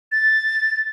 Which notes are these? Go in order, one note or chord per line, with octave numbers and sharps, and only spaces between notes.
A6